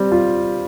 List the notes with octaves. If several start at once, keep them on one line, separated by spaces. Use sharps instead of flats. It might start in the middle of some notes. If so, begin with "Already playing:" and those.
Already playing: G3 C4
F4